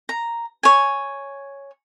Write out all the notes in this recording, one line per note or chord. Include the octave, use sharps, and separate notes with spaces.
A#5
C#5 G#5